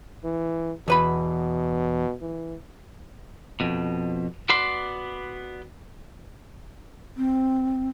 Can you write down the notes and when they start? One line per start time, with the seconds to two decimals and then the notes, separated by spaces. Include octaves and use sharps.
0.24 E3
0.88 E2 B2 B4 B5
2.21 E3
3.60 F2 B2
4.49 B3 F#4 B4 D5 C6
7.17 C4